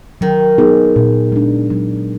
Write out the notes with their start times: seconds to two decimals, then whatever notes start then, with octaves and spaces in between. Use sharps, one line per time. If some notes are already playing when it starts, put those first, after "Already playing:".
0.21 D#3 F#3
0.58 B3 D#4 G#4
0.96 A#2
1.32 G#3 D4
1.70 F#3